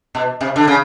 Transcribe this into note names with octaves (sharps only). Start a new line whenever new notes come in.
B2
C3
D3
C#3